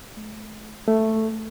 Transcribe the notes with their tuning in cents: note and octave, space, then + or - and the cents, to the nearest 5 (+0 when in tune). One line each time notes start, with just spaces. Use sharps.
A3 -40
A3 +5